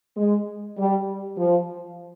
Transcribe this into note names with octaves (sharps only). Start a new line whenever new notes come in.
G#3
G3
F3